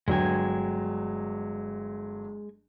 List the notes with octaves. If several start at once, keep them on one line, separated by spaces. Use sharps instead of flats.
G1 F#3 G#3 G5 G#5